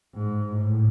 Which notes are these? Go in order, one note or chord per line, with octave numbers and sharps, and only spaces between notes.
G#2
A2